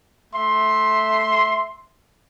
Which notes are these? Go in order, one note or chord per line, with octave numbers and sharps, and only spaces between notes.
A3 E5 C6